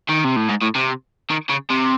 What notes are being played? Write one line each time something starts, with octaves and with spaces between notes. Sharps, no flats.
D#3
C3
A2
G#2
A2
C3
D#3
C#3
C3